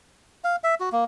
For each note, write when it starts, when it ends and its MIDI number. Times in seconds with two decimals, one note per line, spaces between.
0.44 0.56 77
0.64 0.75 76
0.80 0.89 66
0.92 1.04 58